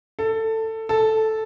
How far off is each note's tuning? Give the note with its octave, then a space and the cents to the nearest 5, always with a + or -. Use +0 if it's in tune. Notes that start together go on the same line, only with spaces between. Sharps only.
A4 +15
A4 -5